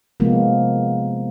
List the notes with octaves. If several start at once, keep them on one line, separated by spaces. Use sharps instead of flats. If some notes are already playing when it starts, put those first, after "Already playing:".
C3 F3 G#3 A#3 B3